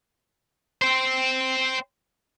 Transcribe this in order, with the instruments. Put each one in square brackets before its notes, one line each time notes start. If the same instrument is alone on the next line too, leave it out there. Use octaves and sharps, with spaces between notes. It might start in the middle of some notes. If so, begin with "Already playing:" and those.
[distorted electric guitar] C5 G5